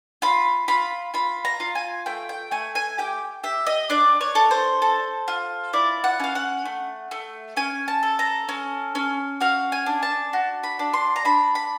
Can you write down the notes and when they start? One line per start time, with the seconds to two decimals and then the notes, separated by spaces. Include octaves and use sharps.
0.22 F4 B5
0.68 F4 B5
1.14 F4 B5
1.45 A#5
1.60 F4
1.75 G#5
2.06 A3 G5
2.29 G5
2.51 A3 G#5
2.75 G#5
2.98 G4 G5
3.43 G4 E5
3.67 D#5
3.90 D4 D5
4.21 C#5
4.35 A4
4.51 C5
4.82 A4
5.28 F4
5.73 E4 D5
6.04 F#5
6.20 C#4 F5
6.35 F#5
6.65 A3
7.11 A3
7.57 C#4 G#5
7.88 A5
8.03 A4
8.19 A#5
8.49 C#4
8.95 C#4
9.41 F#4 F5
9.72 G#5
9.86 D4
10.03 A5
10.33 F#4
10.64 B5
10.79 D4
10.94 C6
11.16 A#5
11.25 D4 B5
11.55 B5